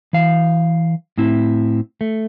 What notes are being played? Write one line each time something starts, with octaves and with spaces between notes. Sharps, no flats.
E3 F5
A2 C4 E4
A3